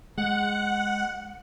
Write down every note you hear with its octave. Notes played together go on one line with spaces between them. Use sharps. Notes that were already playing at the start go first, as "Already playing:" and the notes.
G#3 F#5